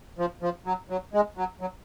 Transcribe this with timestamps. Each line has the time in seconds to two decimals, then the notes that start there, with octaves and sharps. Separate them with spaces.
0.19 F3
0.42 F3
0.66 F#3
0.90 F#3
1.14 G#3
1.37 F#3
1.61 F#3